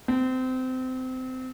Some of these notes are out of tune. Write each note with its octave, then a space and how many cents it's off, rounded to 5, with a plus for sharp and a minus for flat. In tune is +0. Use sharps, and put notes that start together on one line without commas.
C4 -25